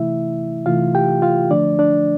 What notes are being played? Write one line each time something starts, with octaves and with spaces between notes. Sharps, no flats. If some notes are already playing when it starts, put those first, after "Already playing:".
Already playing: C3 E3 A3 E4 E5
C3 E3 A3 F4 F5
G4 G5
F4 F5
D3 F3 A3 D4 D5
D4 D5